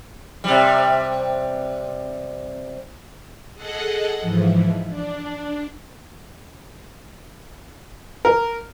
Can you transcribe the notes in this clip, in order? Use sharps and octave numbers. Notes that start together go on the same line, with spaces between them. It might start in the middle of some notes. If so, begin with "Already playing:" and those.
C3 G3
G#4 A4 D#5 F#5
G#2 E3 F3
D4
A#4